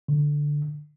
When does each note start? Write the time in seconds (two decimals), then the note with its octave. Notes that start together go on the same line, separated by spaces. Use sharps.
0.08 D3